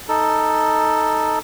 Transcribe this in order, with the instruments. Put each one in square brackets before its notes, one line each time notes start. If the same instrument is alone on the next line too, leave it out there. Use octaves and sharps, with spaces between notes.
[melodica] D#4 A4